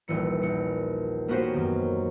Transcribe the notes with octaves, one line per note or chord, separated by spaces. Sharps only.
D#1 A#1 E3 C#7
A#1 C#7
A#3 B3 C#4 F#4 G4 C5
F#2 D#3